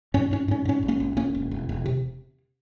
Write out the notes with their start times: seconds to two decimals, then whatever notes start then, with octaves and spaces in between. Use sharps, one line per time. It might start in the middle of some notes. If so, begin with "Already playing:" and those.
0.14 G#2 C#4
0.31 G#2 C#4
0.48 G#2 C#4
0.65 G#2 C#4
0.83 G#1
0.88 A#3 C#4
1.00 G#1
1.17 E1 A#3 C#4
1.35 E1
1.51 E1
1.69 E1
1.86 C3